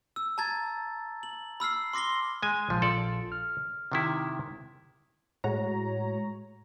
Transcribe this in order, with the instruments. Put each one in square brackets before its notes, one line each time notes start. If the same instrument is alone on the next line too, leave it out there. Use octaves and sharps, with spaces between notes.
[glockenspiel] E6
A5 A#5 G#6 A6
F#7
B5 E6 F6 C7
C6 D6 A#6 C7 G7
[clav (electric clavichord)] G#3 G#5
[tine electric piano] A#1 F4 [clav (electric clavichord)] F3
[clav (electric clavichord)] A4 D5
[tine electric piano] F6
[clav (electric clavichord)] C3 D#3 E4
[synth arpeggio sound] A2 G#3 F#4 C#5 A#5